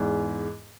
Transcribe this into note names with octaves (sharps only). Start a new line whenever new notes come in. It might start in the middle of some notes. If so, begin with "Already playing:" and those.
Already playing: E2 G#2